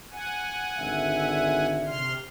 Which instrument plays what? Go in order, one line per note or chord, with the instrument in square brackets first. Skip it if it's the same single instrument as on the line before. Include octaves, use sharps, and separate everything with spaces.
[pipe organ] F#5 G#5
[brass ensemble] G#1 D3 E5
[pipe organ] C3 C6 F6